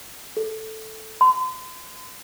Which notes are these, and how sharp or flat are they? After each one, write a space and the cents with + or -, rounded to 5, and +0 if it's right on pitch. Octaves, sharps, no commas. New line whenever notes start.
A4 -5
C6 -40